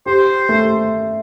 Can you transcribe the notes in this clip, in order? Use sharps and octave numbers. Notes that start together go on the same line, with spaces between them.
G4 C5
A3